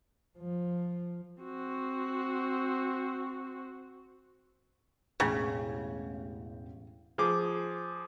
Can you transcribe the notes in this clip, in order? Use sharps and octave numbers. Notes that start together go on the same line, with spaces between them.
F3
C4 F#4
E1 A1 C#3 G5
F3 G#4 D6